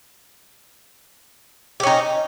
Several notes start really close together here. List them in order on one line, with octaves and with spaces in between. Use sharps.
G4 C#4 D#4